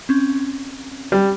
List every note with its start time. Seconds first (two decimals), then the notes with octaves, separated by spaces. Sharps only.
0.09 C4 C#4
1.12 G3